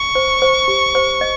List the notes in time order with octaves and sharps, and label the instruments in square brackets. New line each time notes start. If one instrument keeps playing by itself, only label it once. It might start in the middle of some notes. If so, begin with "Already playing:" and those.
Already playing: [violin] C#6
[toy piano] C5
C5
G4
C5
D#5